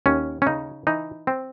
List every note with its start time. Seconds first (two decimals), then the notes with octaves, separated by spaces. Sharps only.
0.06 D#2 C#4
0.42 C#4
0.46 C#3 D#4
0.87 E3 D#4
1.27 C4